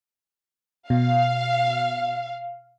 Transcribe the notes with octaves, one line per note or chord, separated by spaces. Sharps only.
B2 F5